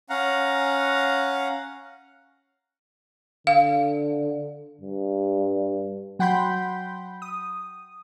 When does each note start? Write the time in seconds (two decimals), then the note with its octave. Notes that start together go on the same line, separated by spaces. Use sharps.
0.10 C#4 F5 F#5 A#5
3.47 D3 F5
4.81 G2
6.19 F#3 F#5 G5 B5 C6 G6
7.22 D#6